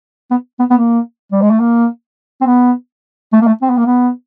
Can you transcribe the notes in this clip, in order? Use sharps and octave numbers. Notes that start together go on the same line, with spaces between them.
B3
B3
B3
A#3
G3
G#3
A3
A#3
C4
B3
A3
A#3
A3
C4
B3
A#3
B3